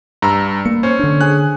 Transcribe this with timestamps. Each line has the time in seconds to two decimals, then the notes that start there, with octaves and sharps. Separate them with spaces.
0.22 G2 A#5 E6
0.65 A#3 C#7
0.83 C#4 C5
0.99 D3 D4
1.21 G#4 G#5 F#6